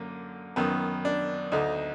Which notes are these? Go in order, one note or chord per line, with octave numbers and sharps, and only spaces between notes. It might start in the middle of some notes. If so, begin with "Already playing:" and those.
Already playing: F#2 D3 A#3
F#2 D#3 B3
D4
D2 D3 D#4